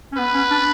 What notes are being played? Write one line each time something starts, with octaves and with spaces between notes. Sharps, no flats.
C#4
B3 B4
C#4
D4